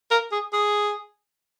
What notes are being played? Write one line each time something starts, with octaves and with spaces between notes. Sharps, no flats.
A#4
G#4
G#4